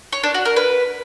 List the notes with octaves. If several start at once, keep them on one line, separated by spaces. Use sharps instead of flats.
C#5
D4
F#4
A#4
B4